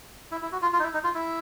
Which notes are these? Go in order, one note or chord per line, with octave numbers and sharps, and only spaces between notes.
E4
E4
F#4
F4
F4
D#4
E4
D#4
F4
E4